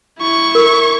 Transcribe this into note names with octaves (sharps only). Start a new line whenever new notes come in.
E4 C#6
A#4